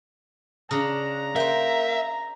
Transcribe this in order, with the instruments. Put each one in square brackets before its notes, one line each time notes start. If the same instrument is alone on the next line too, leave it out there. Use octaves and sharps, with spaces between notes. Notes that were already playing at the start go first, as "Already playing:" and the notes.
[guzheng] C#3 D4 [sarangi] A#5
[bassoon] A#3 [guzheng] C5 G5 [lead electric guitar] E5